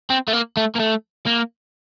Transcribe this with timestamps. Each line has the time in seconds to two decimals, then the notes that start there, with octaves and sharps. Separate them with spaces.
0.10 C4
0.28 A3
0.33 A#3
0.57 A3
0.75 A#3
0.80 A3
1.27 A#3